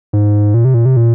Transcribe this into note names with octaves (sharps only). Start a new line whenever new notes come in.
G#2
A#2
C3
A#2
C3
A#2